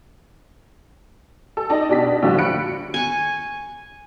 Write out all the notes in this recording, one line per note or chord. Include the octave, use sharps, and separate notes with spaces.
A4
D#4 D5 D#5 A5
B2 D4 G4 D5 B6
A2 D3 F3 F#3 F4 G4
B5 F#6 C#7 D7
G#5 C#6